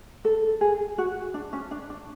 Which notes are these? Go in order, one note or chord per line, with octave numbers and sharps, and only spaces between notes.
A4
G#4
F#4
D4
C#4
D4
D4